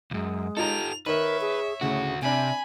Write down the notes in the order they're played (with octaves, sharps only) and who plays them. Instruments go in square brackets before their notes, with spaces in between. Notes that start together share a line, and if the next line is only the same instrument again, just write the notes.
[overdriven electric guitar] C#2 F#2 [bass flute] G#3
[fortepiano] D#4 F4 A#5 [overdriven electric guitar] G4 A4 [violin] F7
[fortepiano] D#3 [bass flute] A#4 [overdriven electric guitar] B4 [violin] C#5 E5
[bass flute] G#4
[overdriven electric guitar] D2 F#4 [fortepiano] A2 [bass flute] C#3
[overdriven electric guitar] C3 [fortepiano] C4 D4 [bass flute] E5 [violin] G#5 B5